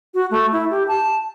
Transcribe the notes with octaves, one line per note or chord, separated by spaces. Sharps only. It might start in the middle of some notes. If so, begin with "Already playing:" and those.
F#4
A3
E4
G4
A5